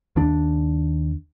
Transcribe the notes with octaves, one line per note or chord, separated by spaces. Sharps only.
D#2 D4